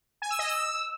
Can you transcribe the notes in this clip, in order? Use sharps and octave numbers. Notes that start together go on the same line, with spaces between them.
G#5
E6
D#5
E6